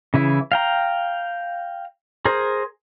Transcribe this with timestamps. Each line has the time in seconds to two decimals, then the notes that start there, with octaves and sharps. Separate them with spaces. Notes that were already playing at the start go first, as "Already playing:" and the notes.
0.14 C#3 E3 E4
0.52 F5 G5 A#5
2.25 G#4 A#4 C5